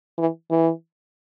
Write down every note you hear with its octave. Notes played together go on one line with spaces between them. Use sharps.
E3
E3